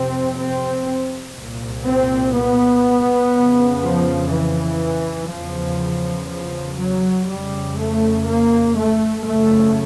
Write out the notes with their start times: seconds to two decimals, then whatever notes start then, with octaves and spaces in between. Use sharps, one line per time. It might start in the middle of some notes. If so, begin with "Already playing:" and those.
Already playing: F2 C3 C4
0.36 C4
1.35 C2 A#2
1.85 C4
2.34 B3
3.34 F2 C#3
3.83 F3
4.31 E3
5.31 E2 C#3 F3
6.29 F3
6.80 F#3
7.28 F2 C#3 G3
7.78 A3
8.27 A#3
8.77 A3
9.26 F#2 C#3 A3